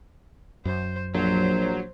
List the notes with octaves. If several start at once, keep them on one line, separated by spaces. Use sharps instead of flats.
F#2 C5
A#1 F#3 C5